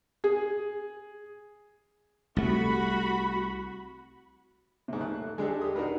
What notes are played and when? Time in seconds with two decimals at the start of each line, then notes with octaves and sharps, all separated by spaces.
0.24 G#4
2.37 C2 A3 F#4 B5
4.88 G#2 C3
5.01 A3 F#6
5.38 G#3 D4 G4 A4
5.61 G4 D#6
5.75 D4 D#4 F#4 A#4 B4